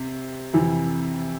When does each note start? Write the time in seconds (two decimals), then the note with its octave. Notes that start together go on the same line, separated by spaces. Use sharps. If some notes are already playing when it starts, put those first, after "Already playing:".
Already playing: C3 C4
0.53 F2 C3 E3